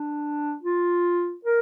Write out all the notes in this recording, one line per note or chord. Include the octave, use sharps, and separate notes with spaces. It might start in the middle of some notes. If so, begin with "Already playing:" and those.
Already playing: D4
F4
A#4